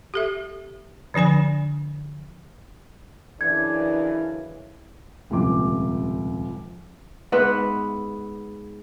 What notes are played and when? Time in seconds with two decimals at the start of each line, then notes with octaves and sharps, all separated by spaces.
0.14 G4 A4 E5
1.14 D3 F3 D4 G#5 B5
3.41 F#2 C#3 E3 D4 G#6
5.30 D#1 C#2 C3 F3 D6
7.32 G#2 B3 B4 E5